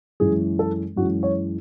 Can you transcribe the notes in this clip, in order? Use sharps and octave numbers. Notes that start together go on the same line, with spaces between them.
F#2 E3 G#3 C#4 G#4
A4
F#2 E3 G#3 C#4 F#4
C#5